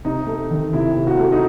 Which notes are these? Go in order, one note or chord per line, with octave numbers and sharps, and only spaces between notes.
C3 D#4
A3
D#3
C3 E4
C3
F#4
A3
D#4